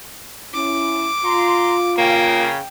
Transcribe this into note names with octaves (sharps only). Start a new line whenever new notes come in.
C#4 E4 D6
F4 A#5 C6
C#3 A#3 G5